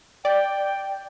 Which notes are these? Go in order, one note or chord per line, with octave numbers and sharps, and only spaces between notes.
D5 G5